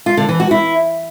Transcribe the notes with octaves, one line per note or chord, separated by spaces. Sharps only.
F4
D3
E3
F#4
E4